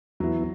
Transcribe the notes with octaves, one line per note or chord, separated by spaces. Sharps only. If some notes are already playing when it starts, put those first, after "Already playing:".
E2 E3 F#3 B3 E4